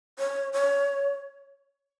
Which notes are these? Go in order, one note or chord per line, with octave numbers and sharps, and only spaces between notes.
C#5
C#5